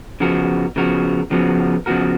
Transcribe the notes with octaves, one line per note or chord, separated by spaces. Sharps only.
C#3 F3 B3 F#4 A#4
C#3 F3 B3 F#4 A#4
C#3 F3 B3 F#4 A#4
C#3 F3 B3 F#4 A#4